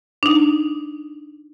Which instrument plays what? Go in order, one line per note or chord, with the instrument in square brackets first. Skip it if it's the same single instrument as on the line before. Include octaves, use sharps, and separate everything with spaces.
[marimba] D4 D#4